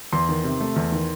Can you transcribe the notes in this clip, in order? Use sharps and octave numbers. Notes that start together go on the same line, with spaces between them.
E2 C6
D#3
C3
A3
E2
D#3